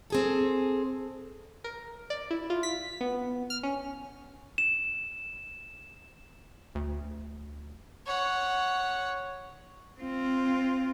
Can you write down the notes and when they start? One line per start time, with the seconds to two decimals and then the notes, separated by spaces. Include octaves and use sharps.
0.10 C4 G#4 A4
1.64 A#4
2.10 D5
2.31 E4
2.50 F4
2.63 B6
3.01 B3
3.50 F6
3.63 C#4
4.58 E7
6.75 D2
8.06 C#5 F#5
10.00 C4 F4